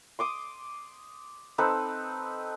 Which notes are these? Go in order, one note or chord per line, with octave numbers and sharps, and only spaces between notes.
C6 D6 D#6
C4 D#4 A4 B4